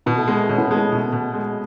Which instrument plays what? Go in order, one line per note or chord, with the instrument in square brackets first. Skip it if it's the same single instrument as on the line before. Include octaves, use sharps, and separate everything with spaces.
[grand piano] B2 [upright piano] B3
[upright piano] A3
[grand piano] G#3 [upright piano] B3
[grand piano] B2 [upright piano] C#4
[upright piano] B3
[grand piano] G#3 [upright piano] A3
[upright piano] B3
[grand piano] B2
B2
G#3